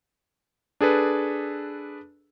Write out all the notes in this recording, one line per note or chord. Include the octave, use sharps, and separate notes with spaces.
D4 G#4 A4 B4